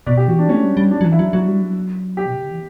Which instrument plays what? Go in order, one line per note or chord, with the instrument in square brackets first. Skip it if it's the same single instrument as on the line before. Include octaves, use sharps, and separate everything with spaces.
[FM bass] B2 [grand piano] D5
[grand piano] G4
[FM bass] E3 [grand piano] F#4
[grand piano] D4
[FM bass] A3 [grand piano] C#4
[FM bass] G3
G3
[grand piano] D4
[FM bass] F#3
E3
[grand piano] E4
[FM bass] F#3
[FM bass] F#3 [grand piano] F#4
[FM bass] G3
F#3
[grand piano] G4
[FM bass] B2
C#3
D3
E3